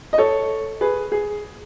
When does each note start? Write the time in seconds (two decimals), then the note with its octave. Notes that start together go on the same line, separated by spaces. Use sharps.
0.13 D#5
0.18 A4 C#5
0.81 G#4 B4
1.12 G#4